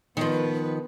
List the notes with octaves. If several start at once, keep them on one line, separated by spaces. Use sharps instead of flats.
D#3 F3 B3 B4